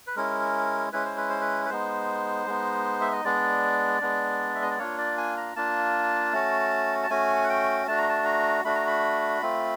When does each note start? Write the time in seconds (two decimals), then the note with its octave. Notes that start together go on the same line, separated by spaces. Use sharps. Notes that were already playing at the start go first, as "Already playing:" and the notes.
0.07 B4
0.16 G#3 C#4 E4 A#4
0.92 G#3 C#4 E4 B4
1.05 C5
1.17 B4
1.29 C5
1.41 B4
1.66 B4
1.70 G#3 B3 D#4 C5
2.47 G#3 B3 D#4
3.01 E5
3.12 D#5
3.24 G#3 B3 D4 D5
4.01 G#3 B3 D4
4.55 E5
4.62 D#5
4.71 D5
4.79 A#3 D4 F4 C#5
4.98 D5
5.17 G#5
5.37 A#5
5.56 A#3 D4 F4 A5
6.33 A3 C#4 F#4
7.03 A5
7.10 A3 C#4 F#4 G#5
7.43 F#5
7.50 G5
7.87 A3 D4 F#4 A5
7.98 A#5
8.09 A5
8.26 A#5
8.64 A3 D4 F#4 B5
8.76 A#5
8.87 B5
9.42 A3 C4 F4